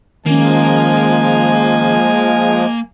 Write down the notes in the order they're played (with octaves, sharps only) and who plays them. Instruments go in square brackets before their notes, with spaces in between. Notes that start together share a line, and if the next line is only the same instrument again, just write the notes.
[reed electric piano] D#3 C#4 [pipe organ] F3 G#3 [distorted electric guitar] A#3 [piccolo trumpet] G#5